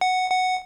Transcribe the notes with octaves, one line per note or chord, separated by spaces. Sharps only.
F#5
F#5